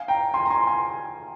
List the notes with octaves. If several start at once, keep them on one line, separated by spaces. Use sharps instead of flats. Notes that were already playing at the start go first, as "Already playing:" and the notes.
Already playing: F5 G#5
G5 A#5
G#5 C6
A#5
G#5 C6
G#5 C6